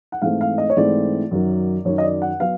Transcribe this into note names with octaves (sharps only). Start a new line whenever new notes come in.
F#5
G#2 E3 A3 C4 F5
F5
D#5
C#5
G#2 E3 A3 C4 D5
F#2 D#3 F#3
F#2 D#3 F#3 C#5
D#5
D5
F#5
F#3 B3 F5